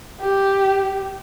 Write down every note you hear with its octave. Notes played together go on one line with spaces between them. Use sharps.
G4